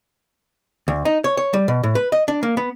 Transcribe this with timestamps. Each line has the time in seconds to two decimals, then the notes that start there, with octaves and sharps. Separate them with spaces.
0.88 D2
1.05 D#4
1.24 C#5
1.37 C#5
1.54 G3
1.68 B2
1.83 A2
1.95 B4
2.12 D#5
2.28 D4
2.43 A#3
2.57 B3